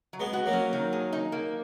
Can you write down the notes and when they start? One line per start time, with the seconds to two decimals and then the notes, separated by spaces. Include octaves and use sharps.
0.13 F#3
0.20 G#3 B3
0.33 F#4
0.46 F#3 A#3
0.53 C#4
0.73 D#3
0.93 G#4
1.13 D#4
1.32 A#3